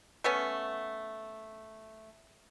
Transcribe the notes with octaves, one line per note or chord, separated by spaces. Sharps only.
A3 B3 C#4